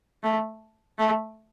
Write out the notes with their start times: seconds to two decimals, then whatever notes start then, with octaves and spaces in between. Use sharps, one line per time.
0.24 A3
0.99 A3